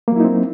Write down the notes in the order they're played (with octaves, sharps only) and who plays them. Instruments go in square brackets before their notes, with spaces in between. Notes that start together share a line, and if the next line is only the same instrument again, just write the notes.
[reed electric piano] A#3
F#3
E4
D#4
C4